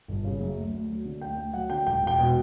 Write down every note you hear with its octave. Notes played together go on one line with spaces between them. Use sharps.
G1
C#3
F#2
D2
D2
F#3
D3
D2 G5
D2 G5
F#3 F#5
D3 G5
E1 G5
E1
G5
B2